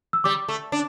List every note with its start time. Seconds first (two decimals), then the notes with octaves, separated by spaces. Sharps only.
0.13 E6
0.24 G3 D6
0.49 A3
0.72 D4